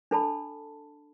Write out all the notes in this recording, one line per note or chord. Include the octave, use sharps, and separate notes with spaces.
D4 A4 A5 B5